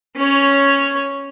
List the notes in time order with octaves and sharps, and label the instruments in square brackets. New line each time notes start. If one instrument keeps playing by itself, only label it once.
[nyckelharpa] C#4 C#5